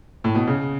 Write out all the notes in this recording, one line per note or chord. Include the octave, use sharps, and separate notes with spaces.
A2
B2
C#3